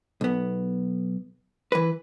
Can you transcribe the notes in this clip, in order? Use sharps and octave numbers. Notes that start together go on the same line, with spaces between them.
B1 B3
E3 B4